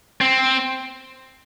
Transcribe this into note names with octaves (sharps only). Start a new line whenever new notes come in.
C4